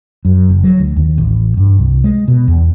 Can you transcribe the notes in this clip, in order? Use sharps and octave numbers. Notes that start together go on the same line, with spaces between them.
F#2
F#1
F#3
D2
D#2
A1
G2
C2
G#3
B2
E2